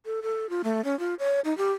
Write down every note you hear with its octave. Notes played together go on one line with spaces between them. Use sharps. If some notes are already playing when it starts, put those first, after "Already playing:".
A4
A4
F4
A3
C#4
F4
C#5
D#4
G4